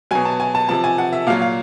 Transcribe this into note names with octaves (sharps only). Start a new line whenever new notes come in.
B2 F#3 G#5
A5
G#5
A5
C3 F3 A5
G#5
F#5
E5
A#2 F#3 F5
F5